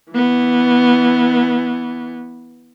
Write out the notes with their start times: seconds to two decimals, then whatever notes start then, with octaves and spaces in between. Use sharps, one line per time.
0.12 E3 B3